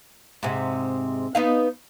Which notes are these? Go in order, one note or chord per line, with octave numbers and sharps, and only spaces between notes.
G#2 C3
B3 D#4 F5